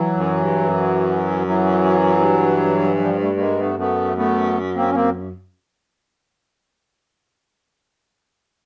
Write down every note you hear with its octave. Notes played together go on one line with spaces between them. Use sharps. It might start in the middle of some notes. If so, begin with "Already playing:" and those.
Already playing: E3 F#3
F#2
G2
F#2
E3 F#3
G2
F#3
F3 G3
G3 A3
A3
G#3 A#3
A3 B3
F#2 A3 B3
A3 B3
A#3 C4
C#4
A#3 C4